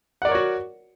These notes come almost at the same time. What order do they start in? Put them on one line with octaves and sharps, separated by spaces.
F#5 D5 A#4 C#5 F#4